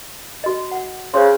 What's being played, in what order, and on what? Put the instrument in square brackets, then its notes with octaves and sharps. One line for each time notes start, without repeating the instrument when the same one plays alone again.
[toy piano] F#4 D#5
F#5
[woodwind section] C#3 [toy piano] C5 C#5 C6